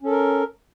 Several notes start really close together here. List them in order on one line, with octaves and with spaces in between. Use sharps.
C#4 A4 A#4